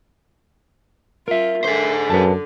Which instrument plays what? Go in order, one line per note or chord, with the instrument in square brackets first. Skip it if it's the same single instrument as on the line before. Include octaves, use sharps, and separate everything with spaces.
[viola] F4 [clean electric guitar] A#4 E5
[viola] D3 [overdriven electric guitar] G#4 C5
[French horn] F#2 [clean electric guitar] B4 A5